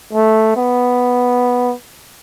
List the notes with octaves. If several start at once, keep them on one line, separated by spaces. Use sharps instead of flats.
A3
B3